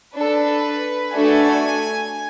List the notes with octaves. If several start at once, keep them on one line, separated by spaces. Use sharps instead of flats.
D4 A4 B4
A3 D4 F#4 A4 G#5